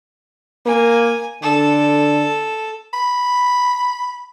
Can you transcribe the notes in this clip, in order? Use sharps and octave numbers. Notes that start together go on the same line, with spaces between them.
A#3 G#5
D3 A4
B5